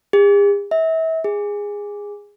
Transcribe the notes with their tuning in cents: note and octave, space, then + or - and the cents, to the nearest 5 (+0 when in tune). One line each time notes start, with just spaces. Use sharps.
G#4 -45
E5 -35
G#4 -15